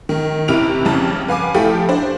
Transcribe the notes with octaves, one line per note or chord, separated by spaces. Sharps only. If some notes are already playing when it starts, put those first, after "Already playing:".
D#3
D#2 C3 E4 F6 D7 F7
A1 F2 C#3 A5
B4 F5 G#5 D6
F3 A3 E4 G4 A4 G5
D4 C5